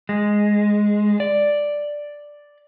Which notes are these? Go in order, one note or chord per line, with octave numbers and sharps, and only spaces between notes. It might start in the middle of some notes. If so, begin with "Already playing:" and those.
G#3
D5